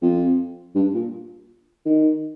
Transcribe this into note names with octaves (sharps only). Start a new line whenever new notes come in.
F2
G2
A#2
D#3